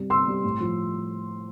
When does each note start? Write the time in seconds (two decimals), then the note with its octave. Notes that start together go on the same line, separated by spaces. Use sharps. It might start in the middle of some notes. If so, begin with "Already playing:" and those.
Already playing: C3 G3
0.10 C3 C6 E6
0.27 G3
0.44 A2
0.60 F3